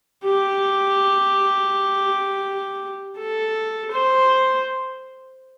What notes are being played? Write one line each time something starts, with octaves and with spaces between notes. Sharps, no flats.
G4
A4
C5